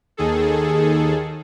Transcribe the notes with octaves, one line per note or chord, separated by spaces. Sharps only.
D#2 D#3 G#4 A4